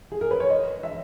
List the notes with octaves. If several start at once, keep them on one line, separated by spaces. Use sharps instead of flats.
G#4
A#4
B4
C#5
D#5
E5